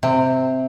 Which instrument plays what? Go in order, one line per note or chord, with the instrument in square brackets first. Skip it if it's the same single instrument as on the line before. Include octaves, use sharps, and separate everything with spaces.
[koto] C3